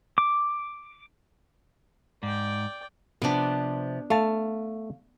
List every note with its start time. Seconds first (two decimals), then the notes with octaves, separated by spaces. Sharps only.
0.18 D6
2.23 G#2 D5 G5
3.22 C3 F3 B3 D4
4.10 A3 F5 A5